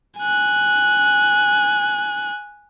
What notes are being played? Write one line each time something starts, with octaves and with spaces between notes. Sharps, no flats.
G#5 F#6